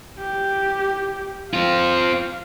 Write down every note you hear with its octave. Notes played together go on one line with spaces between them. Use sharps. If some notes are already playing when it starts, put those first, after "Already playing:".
G4
C4 F4 F5